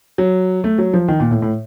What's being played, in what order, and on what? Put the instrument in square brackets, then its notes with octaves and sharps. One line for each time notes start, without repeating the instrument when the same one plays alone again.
[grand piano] F#3
A3
F#3
F3
D#3
A#2
A2
A2